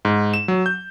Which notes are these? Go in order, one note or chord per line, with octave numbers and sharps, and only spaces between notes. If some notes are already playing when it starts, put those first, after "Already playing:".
G#2
E7
F#3
G6